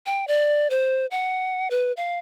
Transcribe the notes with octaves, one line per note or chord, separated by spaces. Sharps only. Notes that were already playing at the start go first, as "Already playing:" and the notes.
G5
D5
C5
F#5
B4
F5